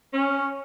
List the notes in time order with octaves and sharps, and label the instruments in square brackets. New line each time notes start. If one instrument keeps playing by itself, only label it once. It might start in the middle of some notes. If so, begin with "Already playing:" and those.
[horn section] C#4